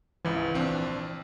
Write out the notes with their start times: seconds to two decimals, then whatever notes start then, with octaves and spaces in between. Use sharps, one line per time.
0.25 G#1 C#2 E3
0.54 A#1 C4 D4